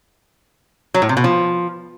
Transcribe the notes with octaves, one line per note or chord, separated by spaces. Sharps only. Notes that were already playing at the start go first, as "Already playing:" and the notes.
F#3
A2
C3
B2
F3